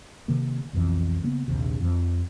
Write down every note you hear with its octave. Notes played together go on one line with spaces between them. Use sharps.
C3 D#3 A#3
B1 F2 E3
C#3 A#3 B3
A#1 D#2 C3
F2 F3